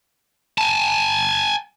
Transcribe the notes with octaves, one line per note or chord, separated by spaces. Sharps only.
G#5 A5